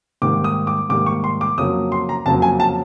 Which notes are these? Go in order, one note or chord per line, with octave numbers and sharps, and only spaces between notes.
G#2 D#3 G3 A#3 D6
D#6
D6
G#2 D#3 G3 A#3 D6
C#6
C6
D6
F2 C#3 F#3 A#3 D#6
C6
A#5
F2 C#3 F#3 A#3 A5
G#5
A5